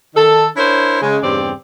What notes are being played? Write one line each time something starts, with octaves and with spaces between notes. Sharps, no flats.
D#3 A4
D4 E4 A#4 C5 C#5
C#3 G#3
E2 G2 C#3 C4 G4 D5